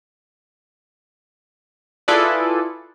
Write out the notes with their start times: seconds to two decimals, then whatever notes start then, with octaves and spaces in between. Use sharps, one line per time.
2.08 E4 F4 G#4 A4 B4 D5